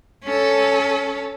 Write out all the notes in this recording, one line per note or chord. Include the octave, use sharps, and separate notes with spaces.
C#4 A4